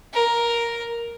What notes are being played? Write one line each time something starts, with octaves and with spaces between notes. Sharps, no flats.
A#4